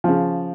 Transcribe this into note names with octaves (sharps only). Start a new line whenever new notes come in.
C#3 F3